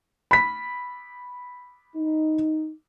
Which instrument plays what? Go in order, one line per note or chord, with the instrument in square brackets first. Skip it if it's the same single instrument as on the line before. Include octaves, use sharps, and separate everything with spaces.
[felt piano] B5 B6
[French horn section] D#4